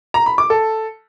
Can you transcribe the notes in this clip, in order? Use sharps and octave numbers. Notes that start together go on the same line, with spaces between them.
A#5
B5
D6
A4